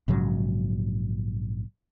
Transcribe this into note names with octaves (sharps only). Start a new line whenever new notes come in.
A#1 G#2 C#3 F#3